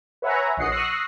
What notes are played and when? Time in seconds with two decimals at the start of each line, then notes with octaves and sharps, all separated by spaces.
0.22 B4 C#5 E5 F#5 G#5 A#5
0.57 A#1 C#5 D#5 F#5 C7 C#7
0.72 C#6 D#6 E6 F#6 A#6 C7